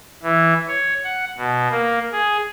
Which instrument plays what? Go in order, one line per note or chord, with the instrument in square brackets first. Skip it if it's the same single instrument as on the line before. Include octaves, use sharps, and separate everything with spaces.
[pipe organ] E3
C#5
F#5
B2
A#3
G#4